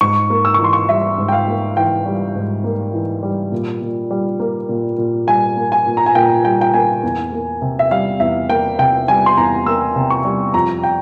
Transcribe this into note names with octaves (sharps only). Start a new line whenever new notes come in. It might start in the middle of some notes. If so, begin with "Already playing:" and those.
G#2 C#6
A#3
E6
C#6
E3 C6
C#6
G3 E5
G#2
G5
F5
A#3
E3 G5
G3
G#2
A#3
E3
G3
A#2
A#2
G3
A#3
A#2
A#2
G3 G#5
A#3
G#5
A#2
A#5
G#5
A#2 G5
G3 G5
G5
A#3 G#5
E2
A#3
C3
E5
G3 F5
E2 E5
A#3 G5
C3 G5
G3 G#5
C6
E2 A#5
A#3 E6
C3
C#6
G3
F2 A#5
G5